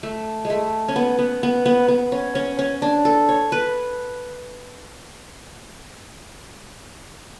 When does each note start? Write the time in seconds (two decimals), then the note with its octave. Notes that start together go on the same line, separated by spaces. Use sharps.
0.03 A3
0.45 G#3
0.50 A3
0.88 C#4
0.96 B3
1.19 B3
1.43 B3
1.66 B3
1.88 B3
2.12 C#4
2.35 C#4
2.59 C#4
2.82 D4
3.05 A4
3.29 C#5
3.52 B4